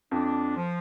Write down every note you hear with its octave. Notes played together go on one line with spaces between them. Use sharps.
F2 D4
F3